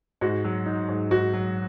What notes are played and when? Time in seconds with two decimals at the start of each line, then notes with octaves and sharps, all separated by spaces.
0.21 G#2 F#4
0.44 F#3
0.66 D#4
0.89 G#2
1.11 G#2 F#4
1.33 F#3